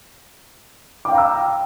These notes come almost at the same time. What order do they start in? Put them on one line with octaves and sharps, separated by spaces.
D6 G5 F5 A#5 E6